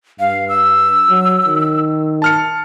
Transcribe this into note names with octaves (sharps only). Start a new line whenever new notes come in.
G2 F5
E6
F#3
D#3
A5 F6 C#7